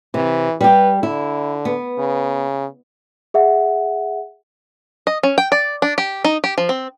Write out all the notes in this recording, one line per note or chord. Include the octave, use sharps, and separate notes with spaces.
C3 E3
G3 G4 B4
D3 E4
B3
C#3
G#4 E5 F#5
D#5
C#4
G5
D5
D4
G4
D#4
G4
F3
C4